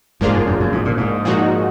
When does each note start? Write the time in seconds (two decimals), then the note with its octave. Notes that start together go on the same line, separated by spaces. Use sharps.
0.21 G#2 F3 A#3 D4 F4 G#4
0.34 F#2
0.47 F#2
0.60 F#2
0.72 G#2
0.85 A#2
0.97 G#2
1.25 A#2 F3 G#3 D#4 F#4